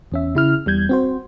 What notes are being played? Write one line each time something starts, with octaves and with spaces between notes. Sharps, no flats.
E2 C#4 E5
C#3 E4 F6
E2 G3 G6 G#6
C4 F#4 C5